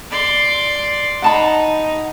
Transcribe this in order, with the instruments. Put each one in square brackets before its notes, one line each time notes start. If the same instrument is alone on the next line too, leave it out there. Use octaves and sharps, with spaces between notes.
[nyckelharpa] D5 C6
[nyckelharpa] D#4 [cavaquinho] F#5 A5 B5